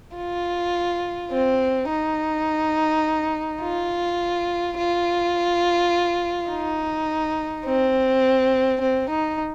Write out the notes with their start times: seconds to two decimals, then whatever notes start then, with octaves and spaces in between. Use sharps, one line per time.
0.16 F4
1.31 C4
1.89 D#4
3.61 F4
4.77 F4
6.50 D#4
7.65 C4
8.81 C4
9.09 D#4